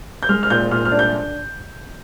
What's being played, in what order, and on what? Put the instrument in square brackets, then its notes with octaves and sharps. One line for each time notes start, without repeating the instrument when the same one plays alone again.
[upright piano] G6
G#3 F6
F6
A#2 G6
A#2 F6
F6
D4
G6